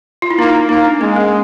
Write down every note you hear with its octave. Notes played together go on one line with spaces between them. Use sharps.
F4
E4
A#3 D#4
A#3 D#4
D4
G#3 C#4
A#3